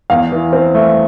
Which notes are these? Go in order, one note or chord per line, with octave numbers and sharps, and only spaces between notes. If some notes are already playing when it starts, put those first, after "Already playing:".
E2 F5
E3
C4
A3